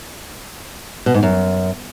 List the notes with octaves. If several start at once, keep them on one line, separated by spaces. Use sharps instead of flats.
B2
G#2
F#2